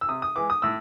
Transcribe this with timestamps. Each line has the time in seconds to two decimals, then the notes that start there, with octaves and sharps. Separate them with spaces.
0.01 E6
0.09 C3 D#6
0.22 D#6
0.36 E3 G#3 D6
0.50 D#6
0.62 A2 E6